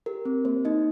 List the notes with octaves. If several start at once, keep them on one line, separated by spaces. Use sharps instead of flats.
G4 A#4
C4
A#3 C5
A#3 D#4 D#5